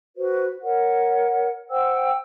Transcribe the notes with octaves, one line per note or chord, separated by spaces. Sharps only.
F#4 B4 C5
A#4 C#5 F#5
C5 F#5 G5 E6